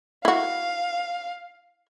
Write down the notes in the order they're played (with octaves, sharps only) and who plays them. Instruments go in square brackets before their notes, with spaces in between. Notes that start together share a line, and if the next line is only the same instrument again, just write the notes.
[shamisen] E4 F#4 [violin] F5